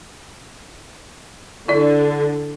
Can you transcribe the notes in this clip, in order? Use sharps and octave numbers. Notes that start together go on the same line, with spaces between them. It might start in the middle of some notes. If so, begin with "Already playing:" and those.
D3 E4 D5